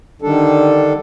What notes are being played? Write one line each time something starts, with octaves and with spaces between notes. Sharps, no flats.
D3 D#3 G3 D4 A4